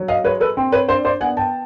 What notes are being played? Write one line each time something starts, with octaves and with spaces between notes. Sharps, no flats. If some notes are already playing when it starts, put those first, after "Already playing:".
Already playing: F#3
D#5 F5
G#3 B4 C#5
A4 B4
C4
B4 C#5
D4 C5 D5
C5 D5
B3 F#5 G#5
G5 A5